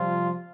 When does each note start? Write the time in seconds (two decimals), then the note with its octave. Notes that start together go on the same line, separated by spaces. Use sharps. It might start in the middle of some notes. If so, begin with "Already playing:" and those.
Already playing: C3 F3 G3 C4 F4